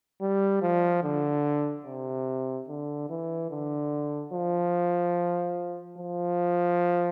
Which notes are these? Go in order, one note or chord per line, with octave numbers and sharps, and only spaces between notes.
G3
F3
D3
C3
D3
E3
D3
F3
F3